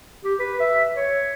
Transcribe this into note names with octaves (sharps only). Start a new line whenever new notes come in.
G4
B4
E5
C#5